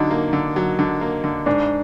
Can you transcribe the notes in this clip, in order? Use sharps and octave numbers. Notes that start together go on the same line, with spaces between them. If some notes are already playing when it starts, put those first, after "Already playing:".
Already playing: D3 F#3 D#4
A#3
D3
F#3
D3
A#3
D3
G#2 D4